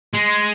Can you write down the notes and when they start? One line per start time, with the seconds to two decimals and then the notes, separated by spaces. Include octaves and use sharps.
0.13 G#3